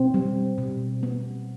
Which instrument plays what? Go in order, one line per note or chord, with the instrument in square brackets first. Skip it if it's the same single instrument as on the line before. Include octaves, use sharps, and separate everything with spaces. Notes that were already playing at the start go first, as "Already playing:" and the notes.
Already playing: [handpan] B2 C4
G3
B2
B3